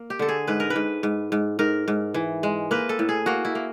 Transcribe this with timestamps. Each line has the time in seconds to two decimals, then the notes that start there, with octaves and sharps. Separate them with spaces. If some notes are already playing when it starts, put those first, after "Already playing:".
Already playing: A#3
0.10 G4
0.19 D3 A4
0.29 G#4
0.47 G#2 B4
0.60 A#4
0.70 B4
0.76 G#2
1.03 G#2
1.32 G#2
1.59 G#2 A#4
1.88 G#2
2.14 E3
2.43 G#3
2.71 A#3 B4
2.89 A4
2.99 A2
3.09 G#4
3.26 A#3 F#4
3.45 E4
3.55 A#3